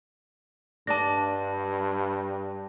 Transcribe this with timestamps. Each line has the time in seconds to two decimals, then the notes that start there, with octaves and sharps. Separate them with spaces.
0.87 G2 D4 D5 D#5 A5 A#6